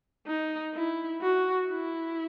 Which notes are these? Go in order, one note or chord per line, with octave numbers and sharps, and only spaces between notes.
D#4
E4
F#4
E4